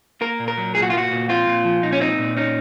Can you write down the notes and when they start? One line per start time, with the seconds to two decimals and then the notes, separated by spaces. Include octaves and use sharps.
0.21 A#3 A#4
0.39 A#2
0.48 A#4
0.58 F#3
0.75 A#2 G#4
0.82 F#4
0.90 F4
0.93 A#3 F#4
1.11 A#2
1.29 C4 F4
1.47 A#2
1.65 F3
1.83 A#2 D#4
1.92 C#4
2.00 C4 D#4
2.18 A#2
2.37 C#4 D#4